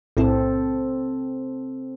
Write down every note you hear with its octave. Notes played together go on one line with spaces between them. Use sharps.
B1 A2 C4 E4 A4